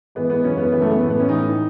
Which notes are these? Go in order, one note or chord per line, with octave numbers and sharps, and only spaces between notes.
G#2 E3 B3
B3
F#2 C#3 E3 C#4
B3
F#2 C#3 E3 B3
A3
B3
A2 E3
B3
C#4
A2 E3 D#4